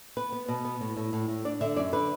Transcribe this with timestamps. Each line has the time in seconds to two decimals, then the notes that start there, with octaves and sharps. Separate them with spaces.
0.17 B3 B4
0.32 B3
0.48 B2
0.65 B3
0.81 A2
0.97 A2
1.13 A2
1.28 A2
1.45 D4 D5
1.61 D3 E5
1.76 F#2 D5
1.93 D3 B4